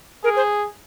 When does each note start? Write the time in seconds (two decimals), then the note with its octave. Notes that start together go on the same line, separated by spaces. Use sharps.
0.24 G#4 A#4
0.36 C5